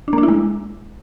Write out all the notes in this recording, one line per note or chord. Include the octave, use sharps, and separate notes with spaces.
D4
A#3
D4
E4
G#3